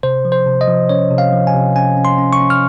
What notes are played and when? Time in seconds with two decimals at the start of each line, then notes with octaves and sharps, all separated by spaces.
0.03 C3 C5
0.25 F3
0.32 C5
0.46 C3
0.61 D#5
0.68 F3
0.89 C#4 C#5
1.11 C3
1.18 F5
1.33 F3
1.47 G#5
1.54 C3
1.76 C#4 G#5
1.97 C#4
2.05 C6
2.18 C#4
2.33 C#6
2.40 C#4
2.50 F6